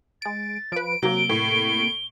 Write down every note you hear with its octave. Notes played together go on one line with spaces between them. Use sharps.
G#3 A6 D7
F3 B4 D7
C3 F#3 A#3 G7
A2